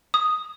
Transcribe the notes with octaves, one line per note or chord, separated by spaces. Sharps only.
D#6